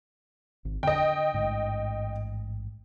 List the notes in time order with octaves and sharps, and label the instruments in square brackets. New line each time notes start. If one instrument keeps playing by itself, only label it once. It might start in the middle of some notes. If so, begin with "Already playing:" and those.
[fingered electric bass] G#1
[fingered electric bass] D3 [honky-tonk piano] D#5 G5
[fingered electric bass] A1 G#2